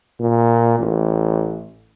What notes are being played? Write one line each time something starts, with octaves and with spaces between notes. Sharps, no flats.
A#2
A1